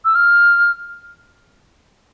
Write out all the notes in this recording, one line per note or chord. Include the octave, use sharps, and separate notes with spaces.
E6
F6